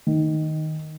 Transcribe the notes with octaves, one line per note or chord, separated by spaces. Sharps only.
D#3